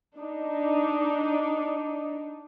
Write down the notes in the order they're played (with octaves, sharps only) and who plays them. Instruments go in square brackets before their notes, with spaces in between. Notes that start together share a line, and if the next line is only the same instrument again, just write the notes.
[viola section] D4 D#4